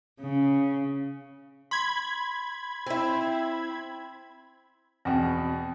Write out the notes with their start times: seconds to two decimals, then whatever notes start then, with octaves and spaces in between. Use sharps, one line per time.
0.20 C#3
1.71 B5 C6 G#6
2.86 C4 E4
5.05 E2 B2 C4 G5